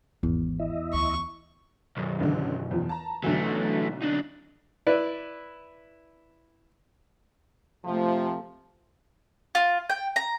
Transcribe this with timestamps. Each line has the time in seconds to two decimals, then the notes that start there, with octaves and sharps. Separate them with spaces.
0.23 G#1 E2
0.59 E4 D#5 E5
0.93 D2 C#6
1.97 B1 F#2
2.20 A1 D3
2.71 E2 F3
2.89 A5 A#5
3.24 B1 D3 E3 F#3 A3
4.02 D4 D#4
4.87 E4 B4 D5
7.85 C3 F3 A3
9.55 F4
9.90 G5
10.16 A#5